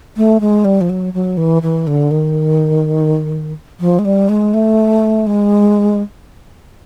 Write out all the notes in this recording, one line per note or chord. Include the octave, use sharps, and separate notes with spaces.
A3
G#3
G3
F3
F#3
F#3
E3
E3
D3
D#3
F3
G#3
G3
G#3
A3
G#3